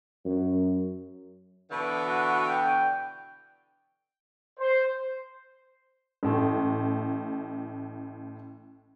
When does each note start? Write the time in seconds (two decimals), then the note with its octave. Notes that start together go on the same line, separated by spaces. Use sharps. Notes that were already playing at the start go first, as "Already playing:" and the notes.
0.25 F#2
1.71 B2 D3 E3
2.06 F#4
2.47 G5
4.59 C5
6.23 A1 A2